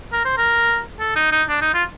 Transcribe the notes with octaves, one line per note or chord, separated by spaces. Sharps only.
A#4
C5
A#4
A4
D#4
D#4
D4
D#4
F4